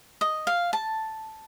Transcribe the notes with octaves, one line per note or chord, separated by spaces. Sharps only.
D#5
F5
A5